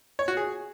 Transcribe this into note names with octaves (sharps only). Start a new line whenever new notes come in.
C#5
F#4
G#4